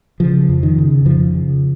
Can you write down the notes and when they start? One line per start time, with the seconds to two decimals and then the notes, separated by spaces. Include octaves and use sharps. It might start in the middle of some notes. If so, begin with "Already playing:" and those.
0.20 C#3 F3
0.49 F2
0.63 D#3
0.78 C#3
1.06 F2 F3
1.35 C#3